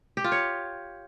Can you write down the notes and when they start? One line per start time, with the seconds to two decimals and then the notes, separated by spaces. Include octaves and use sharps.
0.17 G4
0.24 F4
0.32 C#5